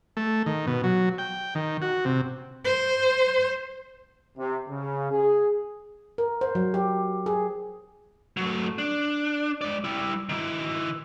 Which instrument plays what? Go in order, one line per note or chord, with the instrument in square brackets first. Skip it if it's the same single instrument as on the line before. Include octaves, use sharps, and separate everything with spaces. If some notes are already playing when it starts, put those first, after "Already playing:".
[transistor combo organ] A3
D#3
B2
F#3
G5
D#3
F#4
C3
[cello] C5
[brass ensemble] C3
C#3
G#4
[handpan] A#4
C5
F#3
G4
G#4
[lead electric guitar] F#3 A3
D4
G#3 D5
G3 E4
D#3 E4